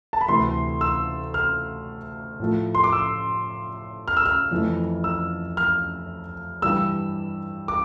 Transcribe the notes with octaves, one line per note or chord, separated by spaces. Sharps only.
A5
B5
D2 C3 E3 A3 C6
E6
F6
A2 F3 A3
C6
D6
E6
F6
E6
F6
F2 E3 A3
E6
F6
G2 E3 G3 E6
D6